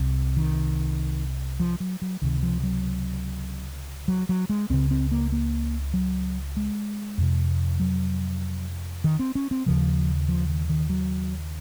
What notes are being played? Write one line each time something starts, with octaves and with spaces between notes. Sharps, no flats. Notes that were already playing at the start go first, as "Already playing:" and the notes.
Already playing: C2 C3
D#3
F3
F#3
F#3
C#2 C3 D#3
F3
F#3
F#3
F#3
G#3
C#2 C#3 C4
C4
A#3
A#3
F#3
G#3
F2 C3
F#3
D#3
C4
C#4
C4
D#2 C#3 F3
F3
D#3
D#3
F#3